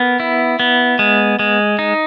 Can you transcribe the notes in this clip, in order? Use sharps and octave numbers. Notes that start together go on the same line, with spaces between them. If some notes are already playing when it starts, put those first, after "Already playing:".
Already playing: B3 A#4
E4
B3
G#3
G#3
D#4